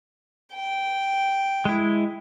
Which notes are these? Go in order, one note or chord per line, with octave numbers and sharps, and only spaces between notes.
G5
G#3 E4